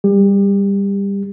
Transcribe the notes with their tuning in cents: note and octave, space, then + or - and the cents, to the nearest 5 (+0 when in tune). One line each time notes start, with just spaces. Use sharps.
G3 +15 G4 +30